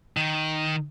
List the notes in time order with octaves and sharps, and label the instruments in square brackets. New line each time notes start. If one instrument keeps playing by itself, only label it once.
[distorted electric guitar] D#3